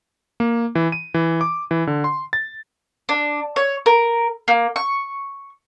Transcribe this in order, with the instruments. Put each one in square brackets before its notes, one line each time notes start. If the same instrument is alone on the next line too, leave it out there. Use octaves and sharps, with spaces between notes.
[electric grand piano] A#3
E3
D#7
E3
D6
E3
D3
C6
A6
[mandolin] D4
C#5
A#4
A#3
C#6